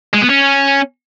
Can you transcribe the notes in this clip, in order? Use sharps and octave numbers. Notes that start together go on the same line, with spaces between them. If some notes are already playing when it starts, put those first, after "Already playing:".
G#3
B3
C#4